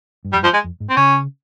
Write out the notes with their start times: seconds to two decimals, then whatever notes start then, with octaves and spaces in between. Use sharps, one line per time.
0.25 G2
0.33 F2 G3
0.41 G2
0.44 F3
0.54 G#3
0.64 F2
0.80 G#2
0.90 C4
0.97 C#3 C#4